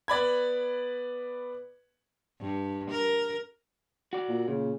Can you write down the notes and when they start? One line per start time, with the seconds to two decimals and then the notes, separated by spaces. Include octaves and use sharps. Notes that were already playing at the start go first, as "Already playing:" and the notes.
0.08 B3 D5 B5 G#6
2.40 G2
2.90 A#4
4.13 F#4 D5
4.29 A#2
4.48 A#2 C#3